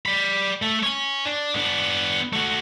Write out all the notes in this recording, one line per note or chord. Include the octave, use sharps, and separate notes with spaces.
D5 B5
A3 A4
C#5 G#5
D4
B3 D4
A3 F#4